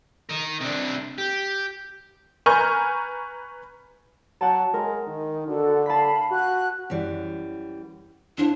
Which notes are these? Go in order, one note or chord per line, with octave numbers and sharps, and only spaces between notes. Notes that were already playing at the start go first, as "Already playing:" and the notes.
A#4 D#5
C3 D4
G4
B4 G#5 A#5 C#6 F6 G6
F#3 F#5 G5 A5
G#3 A#4
D#3
D3 F#4 A4
F5 A5 B5 B6
F#4 F#6
F#2 E3 G3
D4 E4 C5 F5